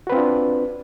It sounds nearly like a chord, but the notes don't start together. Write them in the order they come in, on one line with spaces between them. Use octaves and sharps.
F#4 B4 C4 F4 D4